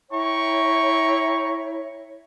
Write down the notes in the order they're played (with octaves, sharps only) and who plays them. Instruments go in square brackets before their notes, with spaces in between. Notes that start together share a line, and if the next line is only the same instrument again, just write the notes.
[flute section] E4 C#5 E5 [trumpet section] G5 A#5 C#6